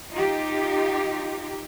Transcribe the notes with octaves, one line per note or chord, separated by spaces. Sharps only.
D#4 F4 G4